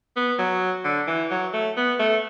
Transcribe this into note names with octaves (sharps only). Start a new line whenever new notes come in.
B3
F#3
D3
E3
F#3
A3
B3
A3